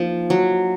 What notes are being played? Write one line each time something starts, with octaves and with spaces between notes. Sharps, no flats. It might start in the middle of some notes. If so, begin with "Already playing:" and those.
Already playing: F3 A#3 D#4
F#3